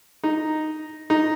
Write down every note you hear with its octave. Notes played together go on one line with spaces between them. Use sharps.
D#4
D#4